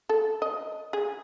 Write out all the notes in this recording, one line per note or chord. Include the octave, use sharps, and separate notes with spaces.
A4
D#5
G#4